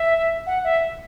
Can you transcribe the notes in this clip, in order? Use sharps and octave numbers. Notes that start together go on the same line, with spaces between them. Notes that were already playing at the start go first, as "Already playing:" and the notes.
Already playing: E5
F#5
E5